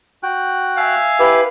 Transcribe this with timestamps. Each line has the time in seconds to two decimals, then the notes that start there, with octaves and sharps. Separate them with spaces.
0.23 F#4 G5 F#6
0.77 E5 F5 G#5
1.19 E4 G4 B4